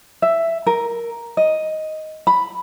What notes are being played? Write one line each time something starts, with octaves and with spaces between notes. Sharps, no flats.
E5
A#4
D#5
B5